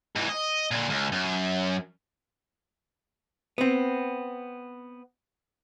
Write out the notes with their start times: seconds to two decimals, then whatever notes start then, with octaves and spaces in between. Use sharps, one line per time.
0.16 G#2 E3
0.29 D#5
0.71 A#2 D3
0.90 C#2
1.12 F#2
3.58 B3 C4